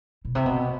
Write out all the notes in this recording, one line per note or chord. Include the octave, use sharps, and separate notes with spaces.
B2
C3
B2